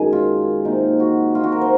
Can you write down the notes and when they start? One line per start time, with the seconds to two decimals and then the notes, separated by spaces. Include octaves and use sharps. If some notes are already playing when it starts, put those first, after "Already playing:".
Already playing: F#2 D#3 G#3 G#5
0.13 F4
0.65 C3 D#3 A#3 D#4
1.00 F#4
1.35 F4
1.43 F#4
1.52 A#4
1.61 C5